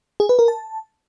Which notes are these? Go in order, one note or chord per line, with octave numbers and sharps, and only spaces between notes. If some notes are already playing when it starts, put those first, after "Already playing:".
G#4
B4
A#4
A5